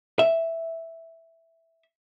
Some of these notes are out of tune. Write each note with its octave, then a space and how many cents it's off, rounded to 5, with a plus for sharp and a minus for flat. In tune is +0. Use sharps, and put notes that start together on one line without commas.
E5 +0